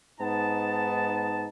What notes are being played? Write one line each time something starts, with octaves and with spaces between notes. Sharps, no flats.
G#2 B3 D#4 A5